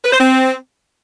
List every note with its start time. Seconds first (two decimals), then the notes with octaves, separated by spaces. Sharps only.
0.05 B4
0.12 C5
0.20 C4